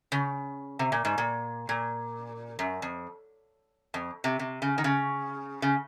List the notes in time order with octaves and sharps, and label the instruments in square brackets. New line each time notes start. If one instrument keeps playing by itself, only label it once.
[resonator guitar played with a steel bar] C#3
C3
A#2
G#2
A#2
A#2
F#2
F2
F2
C3
C3
C#3
D#3
C#3
C#3